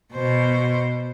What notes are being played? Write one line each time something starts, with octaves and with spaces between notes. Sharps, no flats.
B2 C5